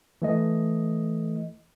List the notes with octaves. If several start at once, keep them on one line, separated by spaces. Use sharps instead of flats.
E3 A3 D#5